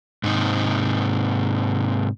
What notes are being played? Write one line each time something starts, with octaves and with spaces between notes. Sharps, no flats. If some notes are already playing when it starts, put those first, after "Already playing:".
G#2 C3 D#4